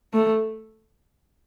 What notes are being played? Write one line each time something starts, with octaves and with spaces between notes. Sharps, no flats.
A3